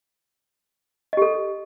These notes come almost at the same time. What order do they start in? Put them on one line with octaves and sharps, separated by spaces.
D#5 G4 A4